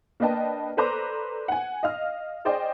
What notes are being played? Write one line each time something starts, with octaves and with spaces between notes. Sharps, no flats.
A#3 D4 B4 D#5 G5 A5
A4 B4 C5 D5 A#5 D6
F#5 G#5
D#5 F5 F6
G#4 C5 D5 D#5 G5